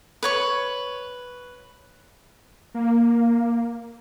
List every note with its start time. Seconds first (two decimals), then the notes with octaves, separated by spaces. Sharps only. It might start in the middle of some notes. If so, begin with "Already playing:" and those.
0.23 B4 C#5 C#6
2.75 A#3